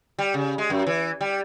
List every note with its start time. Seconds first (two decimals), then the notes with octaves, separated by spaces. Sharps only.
0.19 G3
0.34 C#3
0.58 G#3
0.70 F#2
0.87 E3
1.21 G3